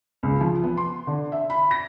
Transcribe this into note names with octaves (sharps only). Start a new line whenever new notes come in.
C#2
F3
B3
C6
D3
E5
B5
A#6